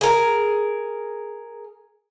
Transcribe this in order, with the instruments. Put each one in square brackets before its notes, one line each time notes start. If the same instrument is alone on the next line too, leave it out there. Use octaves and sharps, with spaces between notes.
[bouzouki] G#4 A#4